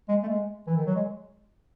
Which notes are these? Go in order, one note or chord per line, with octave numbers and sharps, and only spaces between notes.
G#3
A3
G#3
E3
D#3
F#3
G#3